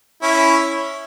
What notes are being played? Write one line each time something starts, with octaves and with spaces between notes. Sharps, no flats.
C#4 E4